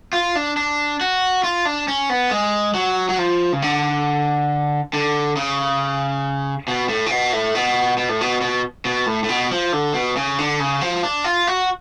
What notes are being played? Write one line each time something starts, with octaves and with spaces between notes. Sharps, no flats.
F4
D4
D4
F#4
F4
D4
C#4
B3
G#3
F#3
F#3
F3
C#3
D3
D3
C#3
B2
A2
C#3
B2
A2
B2
B2
A2
B2
B2
B2
A2
A2
B2
F3
D3
B2
C#3
D3
C#3
F3
D4
F4
F#4